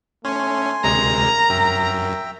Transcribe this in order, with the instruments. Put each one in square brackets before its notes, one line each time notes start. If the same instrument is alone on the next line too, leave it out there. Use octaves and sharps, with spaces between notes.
[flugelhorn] A3 [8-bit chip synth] C#4 [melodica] G#5 C6
[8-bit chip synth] D2 C3 G#3 [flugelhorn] A#4 [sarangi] A#5
[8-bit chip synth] F#2 [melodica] E5 G5